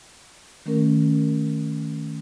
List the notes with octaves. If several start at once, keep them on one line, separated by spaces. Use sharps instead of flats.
D#3 A3 C#4 A#4